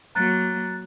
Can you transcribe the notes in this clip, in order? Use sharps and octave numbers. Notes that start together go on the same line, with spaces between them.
F#3 A#3 A#5 F#6 A6